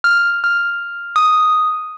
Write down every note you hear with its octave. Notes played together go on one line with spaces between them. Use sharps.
F6
F6
D#6